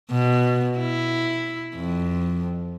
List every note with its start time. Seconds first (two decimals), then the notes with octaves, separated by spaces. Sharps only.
0.11 B2
0.78 E4
1.76 F2